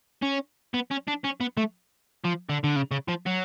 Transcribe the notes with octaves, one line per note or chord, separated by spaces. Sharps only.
C#4
B3
C#4
D4
C#4
B3
A3
F3
D3
D3
C#3
C#3
F3
F#3